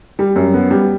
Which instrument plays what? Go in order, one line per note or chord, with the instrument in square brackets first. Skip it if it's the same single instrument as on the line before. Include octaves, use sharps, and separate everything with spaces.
[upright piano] G3
F#2
B3
G3